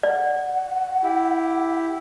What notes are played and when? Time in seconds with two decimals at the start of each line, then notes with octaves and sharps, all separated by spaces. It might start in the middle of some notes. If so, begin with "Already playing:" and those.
0.03 D5 F#5
1.03 E4 G4